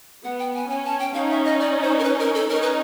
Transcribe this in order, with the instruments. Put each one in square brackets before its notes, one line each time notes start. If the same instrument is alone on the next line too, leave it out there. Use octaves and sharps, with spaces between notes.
[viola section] B3 [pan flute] F#5
[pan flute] G5
G#5
[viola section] C#4 [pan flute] G#5
[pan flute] A5
G5
[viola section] C#4 D#4 [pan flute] F5
[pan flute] E5
D#5
D5
C5
A#4
B4
A#4
A4
[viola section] C#4 D#4 [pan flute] A#4
[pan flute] B4